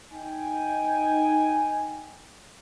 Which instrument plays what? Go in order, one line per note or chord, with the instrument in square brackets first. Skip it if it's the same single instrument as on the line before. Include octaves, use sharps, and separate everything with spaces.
[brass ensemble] D#4 G5 G#5